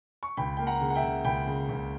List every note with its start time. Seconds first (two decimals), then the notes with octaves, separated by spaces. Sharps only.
0.23 C#6
0.37 C#2 G5 B5
0.57 A#3 G5
0.67 F#5 A#5
0.80 C#3
0.90 F#5
0.95 E5 G5
1.03 C#3
1.25 C#2 G5 B5
1.47 C#3
1.69 C#2